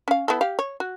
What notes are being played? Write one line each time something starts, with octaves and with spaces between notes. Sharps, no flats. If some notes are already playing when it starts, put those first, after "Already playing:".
C#4 F5
B3 E4 A4
G4 F5
C#5
F#4